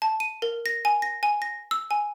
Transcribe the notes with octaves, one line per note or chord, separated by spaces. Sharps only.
A5
D#7
A#4
A#6
G#5
A#6
G#5
A#6
E6
G#5